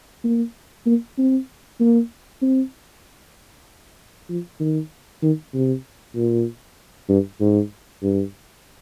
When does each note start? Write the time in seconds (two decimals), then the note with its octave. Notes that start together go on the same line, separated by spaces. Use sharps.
0.24 A#3
0.86 A#3
1.18 C4
1.80 A#3
2.42 C4
4.29 F3
4.60 D#3
5.22 D#3
5.54 C3
6.16 A#2
7.09 G2
7.40 G#2
8.03 G2